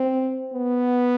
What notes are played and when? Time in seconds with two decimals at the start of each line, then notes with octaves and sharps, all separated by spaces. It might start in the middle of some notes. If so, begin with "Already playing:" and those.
Already playing: C4
0.53 B3